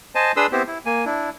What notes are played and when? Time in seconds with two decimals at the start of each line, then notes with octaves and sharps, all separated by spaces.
0.15 C5 D#5 G#5 A5
0.36 D4 G#4 B4 C6 D#6 E6
0.52 B3 C4 E4 G4 C5
0.67 E4
0.86 A#3 G#5
1.05 D4 E4